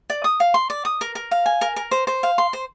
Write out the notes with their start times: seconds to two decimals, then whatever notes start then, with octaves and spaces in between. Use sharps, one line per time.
0.10 D5
0.24 D#6
0.40 F5
0.54 C6
0.70 D5
0.85 D#6
1.01 A#4
1.15 A#4
1.31 F5
1.46 G#5
1.61 A#4
1.76 A#4
1.91 C5
2.07 C5
2.23 F5
2.38 C6
2.53 C5